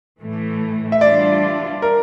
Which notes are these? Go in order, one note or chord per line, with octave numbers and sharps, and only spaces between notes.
A2 E3 A3
E5
E3 G3 D4 F4 D5
A#4